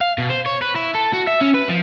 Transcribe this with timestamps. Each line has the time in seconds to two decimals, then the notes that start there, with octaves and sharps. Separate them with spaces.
0.01 F5
0.18 B2
0.30 C5
0.46 C#5
0.62 B4
0.76 E4
0.95 A4
1.13 F#4
1.27 E5
1.41 C#4
1.54 B4
1.69 F3